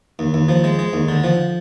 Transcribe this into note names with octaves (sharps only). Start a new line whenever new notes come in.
D#2
D#2
F3
G#3
G#3
D#2
D3
F3